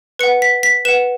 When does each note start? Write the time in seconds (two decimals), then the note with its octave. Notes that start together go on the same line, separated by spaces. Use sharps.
0.19 B4 F#5 C#7
0.42 B6
0.63 B6
0.85 B4 F#5 E7